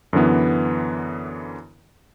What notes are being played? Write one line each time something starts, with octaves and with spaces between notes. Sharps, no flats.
F#2 D3 E3 B3